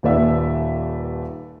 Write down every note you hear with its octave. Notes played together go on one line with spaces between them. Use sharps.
D#1 D#2 B4 D5 E5 E6